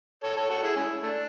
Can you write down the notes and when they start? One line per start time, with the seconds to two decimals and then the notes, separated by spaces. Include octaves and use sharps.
0.23 A4 C#5
0.36 A4 C#5
0.50 F#4 A4
0.63 E4 G#4
0.76 G#3 C#4 E4
1.03 A3 D4